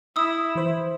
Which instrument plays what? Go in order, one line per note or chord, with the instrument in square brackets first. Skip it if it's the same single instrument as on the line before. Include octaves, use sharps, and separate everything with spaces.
[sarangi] E4 [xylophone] D#6 E6
[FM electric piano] E3 C5